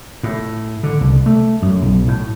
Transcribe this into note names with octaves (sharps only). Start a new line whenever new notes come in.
A2
D3
C2
A3
F#2
B1
A2